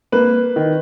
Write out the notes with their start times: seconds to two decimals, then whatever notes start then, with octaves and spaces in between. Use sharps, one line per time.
0.12 A#3 B4
0.56 D#3